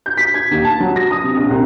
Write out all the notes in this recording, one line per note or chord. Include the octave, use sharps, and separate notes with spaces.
G6
B6
G#6
D#2
A5
F#3
A#6
D#6
C3
A#1
C2